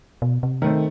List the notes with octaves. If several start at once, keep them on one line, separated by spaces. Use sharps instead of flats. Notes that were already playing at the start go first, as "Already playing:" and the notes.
B2
C3
D#3 A3 C4